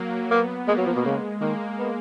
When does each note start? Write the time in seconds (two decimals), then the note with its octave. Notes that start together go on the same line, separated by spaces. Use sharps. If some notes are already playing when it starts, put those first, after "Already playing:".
Already playing: F#3 A#3
0.30 A#3 B3
0.68 G#3 A#3
0.77 F#3
0.86 F3
0.96 B2
1.05 C#3 G#3
1.41 D#3 A#3
1.79 B3